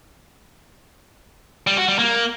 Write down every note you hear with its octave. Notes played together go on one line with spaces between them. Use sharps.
G3
F#4
G3
A#3